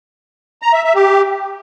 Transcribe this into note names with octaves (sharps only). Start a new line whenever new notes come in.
A#5
E5
E5
G4